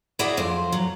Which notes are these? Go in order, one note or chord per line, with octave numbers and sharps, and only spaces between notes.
E4 F#4 G#4 D5 E5 F#5
F2 C5
F#3